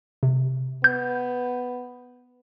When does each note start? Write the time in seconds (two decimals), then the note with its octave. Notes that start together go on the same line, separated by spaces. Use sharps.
0.23 C3
0.84 B3 G6